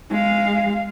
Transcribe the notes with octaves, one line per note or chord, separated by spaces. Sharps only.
G#3 F5